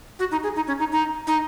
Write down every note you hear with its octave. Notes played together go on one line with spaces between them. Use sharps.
F#4
D#4
G#4
D#4
C#4
D#4
D#4
D#4